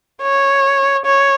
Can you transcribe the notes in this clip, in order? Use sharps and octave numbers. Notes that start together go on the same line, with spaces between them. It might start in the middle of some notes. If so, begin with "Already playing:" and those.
C#5
C#5